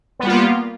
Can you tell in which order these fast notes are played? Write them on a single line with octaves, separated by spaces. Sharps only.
B3 G3 F4 A#3